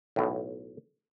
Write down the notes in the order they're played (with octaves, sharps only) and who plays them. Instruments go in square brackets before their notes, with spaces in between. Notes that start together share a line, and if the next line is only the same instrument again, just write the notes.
[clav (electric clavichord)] B1 A2